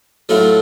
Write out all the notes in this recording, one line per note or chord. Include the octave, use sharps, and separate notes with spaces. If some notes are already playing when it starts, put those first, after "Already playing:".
A2 F#3 A3 F4